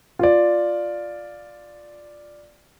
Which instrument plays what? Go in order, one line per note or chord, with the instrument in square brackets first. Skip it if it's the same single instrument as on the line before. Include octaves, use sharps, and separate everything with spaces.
[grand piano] F4 D5